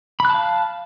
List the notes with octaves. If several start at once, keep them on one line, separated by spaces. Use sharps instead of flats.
F5 A5 B5 F#6